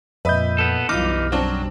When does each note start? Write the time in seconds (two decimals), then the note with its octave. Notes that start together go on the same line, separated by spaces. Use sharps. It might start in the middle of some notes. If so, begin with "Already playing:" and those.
0.25 F2 A#2 B4 D#5 E5 G6
0.58 B3 A4
0.89 B1 F#2 E3 G3 D#4 F4 D6 F6
1.32 F#3 C4 D4